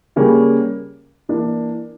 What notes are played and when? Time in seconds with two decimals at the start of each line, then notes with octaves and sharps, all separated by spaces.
0.16 C#3 G3 A#3 C#4
1.29 E3 A#3 D4